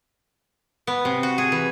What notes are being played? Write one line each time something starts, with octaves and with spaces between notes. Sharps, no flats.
B3
C3
F#4
G#4
E3